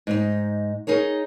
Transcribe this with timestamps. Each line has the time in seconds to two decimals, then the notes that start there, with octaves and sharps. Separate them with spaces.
0.07 G#2 D#4
0.87 D#4 G#4 A#4 C#5